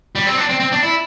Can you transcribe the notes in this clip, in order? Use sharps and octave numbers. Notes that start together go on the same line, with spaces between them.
G3
C4
D4
C4
C4
D4
E4